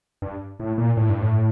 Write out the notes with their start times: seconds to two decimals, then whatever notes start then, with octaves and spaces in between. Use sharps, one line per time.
0.22 G2
0.60 A2
0.78 A#2
0.97 A2
1.09 G2
1.22 A2